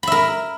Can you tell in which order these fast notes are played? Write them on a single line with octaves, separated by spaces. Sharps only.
B5 E5 A#4